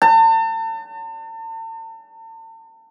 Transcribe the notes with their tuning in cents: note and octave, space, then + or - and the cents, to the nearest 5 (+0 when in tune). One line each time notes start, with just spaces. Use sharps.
A5 +40